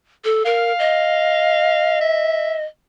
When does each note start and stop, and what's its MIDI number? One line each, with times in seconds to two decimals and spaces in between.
0.24 0.43 69
0.45 0.72 70
0.45 1.96 77
0.79 2.64 75
2.01 2.56 76